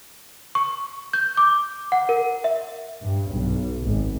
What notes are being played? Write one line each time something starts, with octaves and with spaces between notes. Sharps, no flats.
C#6
G6
D6
F#5
A#4
E5
G2
B1
G#1